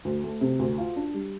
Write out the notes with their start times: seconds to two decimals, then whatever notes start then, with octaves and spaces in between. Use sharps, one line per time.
0.05 D2
0.24 A3
0.41 C3
0.59 D2
0.78 F4
0.96 D4
1.14 G3